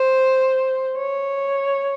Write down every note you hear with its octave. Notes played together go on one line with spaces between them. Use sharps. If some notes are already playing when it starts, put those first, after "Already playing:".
Already playing: C5
C#5